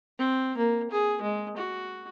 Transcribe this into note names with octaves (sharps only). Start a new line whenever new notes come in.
C4
A#3
G#4
G#3
F#4